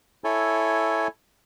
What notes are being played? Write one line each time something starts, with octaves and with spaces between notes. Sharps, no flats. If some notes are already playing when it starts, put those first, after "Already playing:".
E4 A4 C#5 G#5